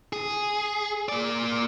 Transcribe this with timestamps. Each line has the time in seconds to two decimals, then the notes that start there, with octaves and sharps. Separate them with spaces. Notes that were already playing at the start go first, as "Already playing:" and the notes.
0.13 G#4
1.09 A#3 D5